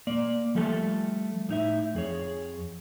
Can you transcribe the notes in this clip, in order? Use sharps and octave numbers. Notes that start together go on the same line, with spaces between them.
A#3 D5
F3 G3 A3 A4 E5 A5
A2 D#4 E5
F2 G#4 C#5